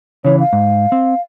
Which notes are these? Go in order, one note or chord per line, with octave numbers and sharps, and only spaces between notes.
C#3 E3 C#5
F5
G#2
C4